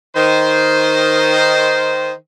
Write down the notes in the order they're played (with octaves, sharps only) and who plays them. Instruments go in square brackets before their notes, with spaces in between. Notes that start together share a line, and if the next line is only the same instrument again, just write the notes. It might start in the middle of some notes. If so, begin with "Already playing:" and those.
[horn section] D#3 C5